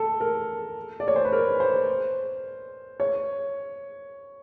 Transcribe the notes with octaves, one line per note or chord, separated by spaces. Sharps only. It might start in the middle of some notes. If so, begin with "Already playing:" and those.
Already playing: A4
A#4
D5
C#5
C5
B4
A#4
C5
C#5